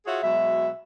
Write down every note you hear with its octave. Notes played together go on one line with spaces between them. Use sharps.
F4 F#4 G#4 C#5 E5 F5
B2 F#3 G#3 E5